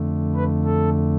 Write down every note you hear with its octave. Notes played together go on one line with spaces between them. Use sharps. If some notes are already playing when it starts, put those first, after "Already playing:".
Already playing: F2 D3 A3
B4
A4